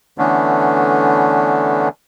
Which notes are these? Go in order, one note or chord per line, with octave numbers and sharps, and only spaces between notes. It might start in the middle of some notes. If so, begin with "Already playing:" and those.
D3 E3 A3 B3 C#4 D4